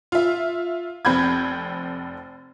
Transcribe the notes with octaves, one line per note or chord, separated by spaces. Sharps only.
F4 E5
F1 C4 B5 G6 G#6